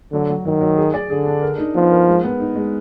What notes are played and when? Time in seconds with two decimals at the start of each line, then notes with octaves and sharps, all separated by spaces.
0.12 D3 F#3
0.30 F#3
0.45 D#3 F#3
0.61 F#3
0.77 G#4
0.94 D5
1.10 D3 G#4
1.26 D4
1.42 A#4
1.58 D#4
1.75 F3 B3
1.92 A#4
2.08 G#3
2.23 B3
2.40 D#4
2.56 G#3